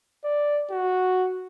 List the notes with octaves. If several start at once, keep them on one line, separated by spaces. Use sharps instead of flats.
D5
F#4